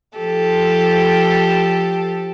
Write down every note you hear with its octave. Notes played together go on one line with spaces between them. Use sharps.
F3 G4 A4